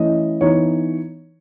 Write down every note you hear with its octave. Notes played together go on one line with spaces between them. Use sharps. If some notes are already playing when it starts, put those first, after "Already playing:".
Already playing: E3 A3 C#4 E4 D#5
E3 B3 D#4 C#5